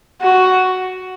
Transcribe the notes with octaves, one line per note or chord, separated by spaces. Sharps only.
F#4